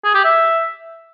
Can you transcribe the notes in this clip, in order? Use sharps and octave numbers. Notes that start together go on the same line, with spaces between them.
G#4
G4
E5